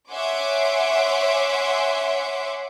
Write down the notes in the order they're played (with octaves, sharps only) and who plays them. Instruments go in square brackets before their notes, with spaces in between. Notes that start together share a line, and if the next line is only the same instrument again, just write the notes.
[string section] C#5 E5 F#5 G#5 C6 D6